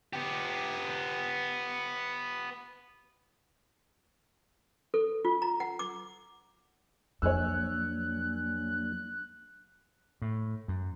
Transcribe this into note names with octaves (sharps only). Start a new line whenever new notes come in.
B3 G4
A4
F4
A#5
F#5
D6
F2 F#3 A#3 D4 C#5 G#5 E6 F#6
A2
F#2